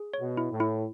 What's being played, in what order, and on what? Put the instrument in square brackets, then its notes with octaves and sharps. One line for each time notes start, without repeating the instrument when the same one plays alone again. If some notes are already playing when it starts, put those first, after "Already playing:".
Already playing: [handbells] G#4
C#5
[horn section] B2
[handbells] E4
[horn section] A2
[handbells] E4